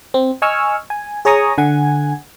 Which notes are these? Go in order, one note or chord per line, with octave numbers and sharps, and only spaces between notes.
C4
D#5 G#5 C#6 E6 F6
G#5
G#4 C#5 G#5 A#5 C#6 D#6
D3 F#5 G#5 G#6